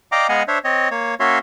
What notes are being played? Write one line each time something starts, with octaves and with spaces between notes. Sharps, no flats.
D5 D#5 F5 G5 A#5 D6
G#3 B3 D#5 F5 F#5 G#5
D4 C5 C#5 E5
C4 C#5 D#5
A#3 C#5
A#3 C#4 F#4 C#5 E5 C6